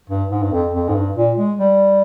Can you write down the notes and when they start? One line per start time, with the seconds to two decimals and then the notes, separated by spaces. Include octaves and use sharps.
0.10 G2
0.30 G#2
0.42 G2
0.52 F2
0.74 F2
0.89 G#2
0.95 G2
1.16 A#2
1.37 G#3
1.59 G3